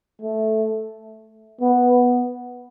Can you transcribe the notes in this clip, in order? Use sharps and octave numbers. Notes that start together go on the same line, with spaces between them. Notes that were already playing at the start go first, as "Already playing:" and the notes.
A3
B3